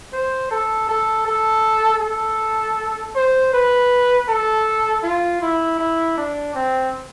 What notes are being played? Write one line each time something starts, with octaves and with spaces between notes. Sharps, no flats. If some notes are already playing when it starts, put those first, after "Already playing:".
C5
A4
A4
A4
A4
C5
B4
A4
F4
E4
E4
D4
C4